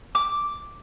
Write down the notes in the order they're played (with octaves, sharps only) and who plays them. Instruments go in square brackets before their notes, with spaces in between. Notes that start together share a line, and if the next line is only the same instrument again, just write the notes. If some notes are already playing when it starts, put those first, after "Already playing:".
[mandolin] D6